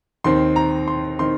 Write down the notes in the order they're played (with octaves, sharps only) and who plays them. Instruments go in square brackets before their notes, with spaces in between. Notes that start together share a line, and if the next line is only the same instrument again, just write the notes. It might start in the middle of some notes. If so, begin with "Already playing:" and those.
[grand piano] D#2 D#3 C4 C6
A#5
C6
D#3 C4 C6